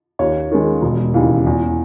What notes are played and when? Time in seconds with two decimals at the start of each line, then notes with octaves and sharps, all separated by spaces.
0.19 D#2 C#5
0.51 D#3 G#3
0.82 E1
1.14 D#2 C#3 E3
1.46 E2